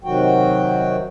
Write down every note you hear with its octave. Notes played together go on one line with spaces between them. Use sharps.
C3 D#3 F#3 F#4 G5